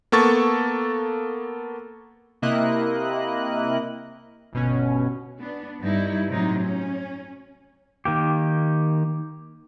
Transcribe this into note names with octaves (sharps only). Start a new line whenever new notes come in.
A#3 B3 A4 C#6 A6
C3 A#3 E4 D#5 F#6
G1 B2 C#4
B3 D4
G2 G3 D#4 E4
A2 C3 F#3 D#4
C#4
D#3 A#3 G4